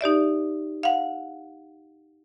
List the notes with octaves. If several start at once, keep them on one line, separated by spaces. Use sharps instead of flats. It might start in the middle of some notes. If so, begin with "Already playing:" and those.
D#4 G4 D5 E5
F5 F#5